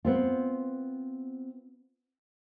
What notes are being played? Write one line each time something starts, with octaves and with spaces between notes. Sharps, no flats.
B3 C4 F4